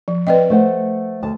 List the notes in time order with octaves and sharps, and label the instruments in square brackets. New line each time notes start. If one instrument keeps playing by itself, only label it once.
[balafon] F3
[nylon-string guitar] C4 [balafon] B4 D5 D#5
[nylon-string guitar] A3 C5 F#5
D2 A5